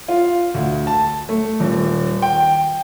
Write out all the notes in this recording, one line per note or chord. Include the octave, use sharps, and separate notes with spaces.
F4
D2
A5
A3
D#1
G5